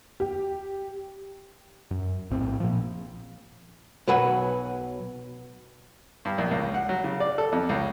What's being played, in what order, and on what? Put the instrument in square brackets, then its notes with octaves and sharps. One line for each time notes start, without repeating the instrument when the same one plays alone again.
[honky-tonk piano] G4
[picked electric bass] F#2
A#1 A2 C4
A#2 F3
[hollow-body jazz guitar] B1 F#3 B4 F#5 G#5
[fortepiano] G2
A#1
C#2
F#5
F#3
C#3
D5
A4
F2
C#2